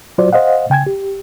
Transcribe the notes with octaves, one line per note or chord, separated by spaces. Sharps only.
F#3 F4 F#4 C5 D5
C5 D#5 F5 F#5
C#3 G5 G#5 G#6
G4